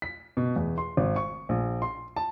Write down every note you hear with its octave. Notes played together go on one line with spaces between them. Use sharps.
B6
B2
E2
C6
G#1
C#6
A#1
C6
A5